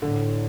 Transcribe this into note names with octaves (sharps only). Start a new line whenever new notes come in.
A2 D3